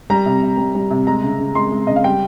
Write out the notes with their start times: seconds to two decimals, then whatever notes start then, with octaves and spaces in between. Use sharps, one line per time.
0.10 G3 A#5
0.26 C3
0.42 C3
0.58 G3
0.75 G3
0.90 C3
1.07 G#3 A#5
1.23 C#3
1.40 C#3
1.55 G#3 C6
1.72 G#3
1.87 C#3 D#5
1.96 F5
2.04 G3 G5